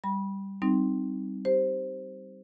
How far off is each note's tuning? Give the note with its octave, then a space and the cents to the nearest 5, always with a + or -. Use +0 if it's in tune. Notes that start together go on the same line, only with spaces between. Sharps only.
G3 +0 B5 -20
G3 -10 C4 -5 D#4 +0
G4 +0 C5 +0